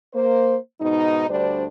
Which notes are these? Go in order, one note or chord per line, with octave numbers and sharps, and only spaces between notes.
A#3 C5
G#2 B2 D#4
D2 G3 D4 C5 D5